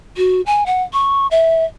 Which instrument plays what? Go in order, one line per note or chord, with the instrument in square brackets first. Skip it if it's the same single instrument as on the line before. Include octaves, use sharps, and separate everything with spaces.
[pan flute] F#4
G#5
F#5
C#6
E5